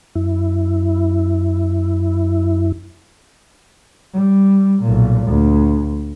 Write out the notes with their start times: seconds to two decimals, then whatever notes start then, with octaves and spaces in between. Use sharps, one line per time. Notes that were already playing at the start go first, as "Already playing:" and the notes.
0.15 F#2 E4
4.13 G3
4.82 B1 A#2
5.27 D2